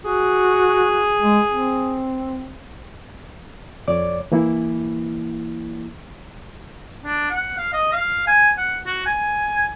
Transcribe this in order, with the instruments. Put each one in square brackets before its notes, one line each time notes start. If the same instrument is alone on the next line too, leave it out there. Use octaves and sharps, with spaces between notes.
[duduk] F#4 [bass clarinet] G#4
[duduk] G#3
C4
[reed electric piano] F2 C#5 D5 D6
E3 A#3 E4
[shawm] D4
F#5
F5
D#5
F5
G#5
F#5
F#4
G#5